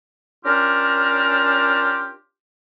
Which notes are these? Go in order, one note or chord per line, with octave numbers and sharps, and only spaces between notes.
C#4 D4 F4 G4 A#4